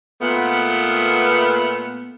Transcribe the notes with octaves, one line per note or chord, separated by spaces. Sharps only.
A#2 A3 B3